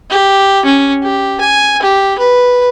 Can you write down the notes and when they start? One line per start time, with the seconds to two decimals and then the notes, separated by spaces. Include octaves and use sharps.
0.10 G4
0.66 C#4
1.03 G4
1.41 G#5
1.82 G4
2.19 B4